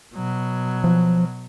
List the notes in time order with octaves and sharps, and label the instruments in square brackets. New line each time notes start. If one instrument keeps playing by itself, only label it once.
[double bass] B2 F#3
[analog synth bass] F3